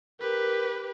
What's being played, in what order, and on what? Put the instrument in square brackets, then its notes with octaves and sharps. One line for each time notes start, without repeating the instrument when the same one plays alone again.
[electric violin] G4 B4 [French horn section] A#4